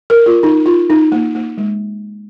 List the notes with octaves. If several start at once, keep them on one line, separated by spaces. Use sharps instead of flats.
A#4
F4
D#4
F4
D#4
A#3
A#3
G#3